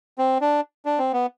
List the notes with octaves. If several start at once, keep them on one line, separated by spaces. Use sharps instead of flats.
C4
D4
D4
C4
B3